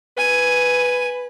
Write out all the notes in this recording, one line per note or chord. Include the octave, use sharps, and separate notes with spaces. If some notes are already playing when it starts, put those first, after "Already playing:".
B4 G#5